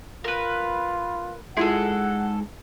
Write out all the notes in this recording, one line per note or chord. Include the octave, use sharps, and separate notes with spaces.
F4 A#4 B4
G#2 G#3 E4 F4 G#4 A4 E5 F#5